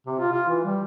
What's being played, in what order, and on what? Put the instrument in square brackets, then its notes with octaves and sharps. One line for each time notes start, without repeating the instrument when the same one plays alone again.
[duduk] C3
F4
F4
E3
G3